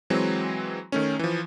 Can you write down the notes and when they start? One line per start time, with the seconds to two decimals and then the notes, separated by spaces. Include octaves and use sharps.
0.10 E3 F#3 G#3 C4
0.92 D#3 A3 C#4
1.19 E3 F3